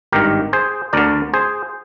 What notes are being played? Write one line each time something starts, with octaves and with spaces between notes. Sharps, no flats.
G#1 G2 D#3 G4 A#4
G#4 C5
D2 D3 A#4 D5
G#4 C5